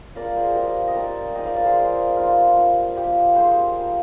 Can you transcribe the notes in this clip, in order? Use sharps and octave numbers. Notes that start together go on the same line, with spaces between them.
F3 G#3 D4 F4 A#4 D5
G#4 C5
G#4
F3 C4 F4 G4 A#4
D#5
G3 C4 D#4 A#4 D5
F3 G#3 D#4 D#5 G5
D5 F5
A#4 D5
G#4 C5
F3 G#3 C4
G3 C4 D#4 F4
G3 A#3 D4 F4
F3 A#3 F4 G4
G3 C4 D#4 G#4 C5
G3 A#3 F4